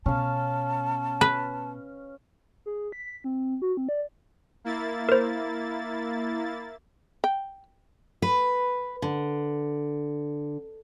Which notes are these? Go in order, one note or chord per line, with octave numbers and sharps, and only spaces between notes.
B2 C#4 F5 A5
B4
G#4
B6
C4
F#4
C4
D5
A#3 E4 A6
A#4 C5
G5
B4
D3